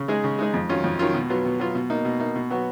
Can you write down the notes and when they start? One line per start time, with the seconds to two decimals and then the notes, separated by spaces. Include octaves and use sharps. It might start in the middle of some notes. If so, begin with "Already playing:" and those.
Already playing: C#3
0.08 G#3 D#4 G#4
0.24 C#3
0.39 G#3 D#4 G#4
0.54 F2
0.69 D#3 F#3 C#4 F4
0.84 F2
0.99 D#3 F#3 C#4 F4
1.14 B2
1.29 F#3 B3 F4
1.45 B2
1.60 F#3 B3 F4
1.75 B2
1.90 A#3 D#4
2.05 B2
2.20 A#3 D#4
2.35 B2
2.51 F#3 B3 F#4